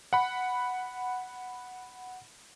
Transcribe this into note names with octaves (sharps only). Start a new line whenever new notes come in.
F#5 B5